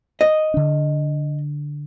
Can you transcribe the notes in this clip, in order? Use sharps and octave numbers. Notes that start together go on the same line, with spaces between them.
D#5
D3 D4